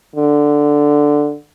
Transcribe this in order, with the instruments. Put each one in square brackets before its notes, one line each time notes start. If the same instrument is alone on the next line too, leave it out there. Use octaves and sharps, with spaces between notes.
[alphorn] D3